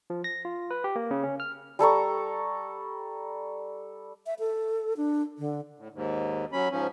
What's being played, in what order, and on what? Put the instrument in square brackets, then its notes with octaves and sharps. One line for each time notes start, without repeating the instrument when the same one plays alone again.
[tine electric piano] F3
A#6
F4
B4
G4
A#3
C#3
C#4
F6
[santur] G3 A4 A#5 C#6
[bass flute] E5
A4
D4
D3
[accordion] A2
D#2 G#2
F#3 C#4 B5
G#2 F3 C#4